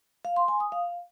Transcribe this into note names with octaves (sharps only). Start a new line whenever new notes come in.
F5
C6
G#5
D#6
F5